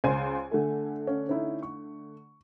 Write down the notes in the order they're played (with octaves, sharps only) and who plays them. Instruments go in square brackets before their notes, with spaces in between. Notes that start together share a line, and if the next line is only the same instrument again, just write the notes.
[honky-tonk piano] C#2 C5 D#7 [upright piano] G#5
[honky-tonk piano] D3 A3
[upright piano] C#4
C#4 D#4 E4
C#6